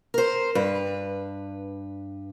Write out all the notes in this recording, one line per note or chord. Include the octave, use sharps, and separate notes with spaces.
A#4 C5
G2 B4